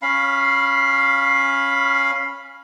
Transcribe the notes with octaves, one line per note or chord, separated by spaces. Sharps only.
C#4 F5 B5